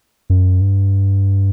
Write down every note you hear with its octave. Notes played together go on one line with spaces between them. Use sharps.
F#2
G2